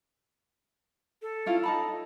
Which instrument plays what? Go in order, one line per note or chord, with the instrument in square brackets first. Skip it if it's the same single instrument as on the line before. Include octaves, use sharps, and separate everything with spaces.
[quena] A4
[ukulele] C#4 E4 F4
D#4 A5 B5